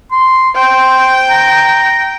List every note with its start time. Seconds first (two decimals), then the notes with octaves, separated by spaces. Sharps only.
0.12 C6
0.56 C5 G5
1.30 A#5